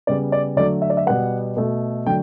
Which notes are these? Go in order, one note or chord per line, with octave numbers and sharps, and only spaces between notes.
C#3 G3 B3 D5
D5
D3 F#3 A3 D5
E5
D5
E5
B2 G3 B3 F#5
B2 A3
D3 F#3 A3 G5